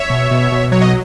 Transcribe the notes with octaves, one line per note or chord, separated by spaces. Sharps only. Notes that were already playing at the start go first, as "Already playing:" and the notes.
Already playing: C#5 E5
B2
B2
B2
F#3 C#5
D#5